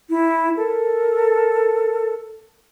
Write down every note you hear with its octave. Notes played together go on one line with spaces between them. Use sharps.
E4
A4 A#4